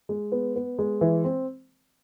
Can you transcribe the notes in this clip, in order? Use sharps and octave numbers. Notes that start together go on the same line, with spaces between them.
G#3
B3
B3
G#3
E3
C4